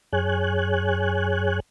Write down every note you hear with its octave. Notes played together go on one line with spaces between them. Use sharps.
F#2 G#4 C#5 G#5 F#6